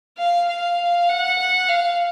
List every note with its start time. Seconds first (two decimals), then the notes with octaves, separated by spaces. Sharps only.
0.18 F5
0.48 F5
1.09 F#5
1.69 F5